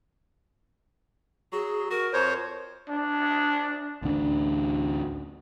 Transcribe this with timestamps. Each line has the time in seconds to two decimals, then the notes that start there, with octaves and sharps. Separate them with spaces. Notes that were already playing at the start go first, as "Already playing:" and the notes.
1.52 F#3 G#4
1.90 F#4 A#4
2.13 F2 C5 C#5
2.89 D4
4.02 A1 D2 D4